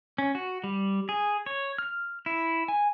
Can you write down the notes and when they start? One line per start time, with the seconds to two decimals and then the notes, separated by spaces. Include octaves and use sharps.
0.18 C#4
0.35 F#4
0.64 G3
1.09 G#4
1.46 C#5
1.79 F6
2.26 E4
2.68 G#5